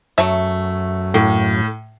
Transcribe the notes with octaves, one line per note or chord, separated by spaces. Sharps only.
F#2 F#3 A3 E5
A2 A#3